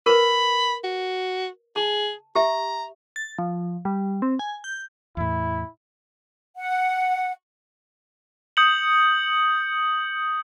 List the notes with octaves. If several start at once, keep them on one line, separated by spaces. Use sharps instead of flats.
A#4 B4 B5
F#4
G#4 A5
G4 E5 A#5
A6
F3
G3
C4
G#5
G6
E2 A2 E4
F#5
D#6 G6 C#7 F#7